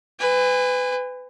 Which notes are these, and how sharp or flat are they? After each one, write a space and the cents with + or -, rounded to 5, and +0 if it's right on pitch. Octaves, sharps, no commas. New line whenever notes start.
B4 +25 G#5 -35